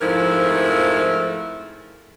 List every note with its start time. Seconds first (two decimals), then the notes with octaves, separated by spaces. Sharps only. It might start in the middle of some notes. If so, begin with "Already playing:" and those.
0.02 F2 G#2 F3 A3 E4 A#4